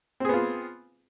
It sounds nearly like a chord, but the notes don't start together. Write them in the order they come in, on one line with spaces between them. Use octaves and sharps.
C4 G#4 B3 F4